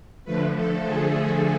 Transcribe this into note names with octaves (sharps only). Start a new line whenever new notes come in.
D3 F3 A3 B4
A4
G#4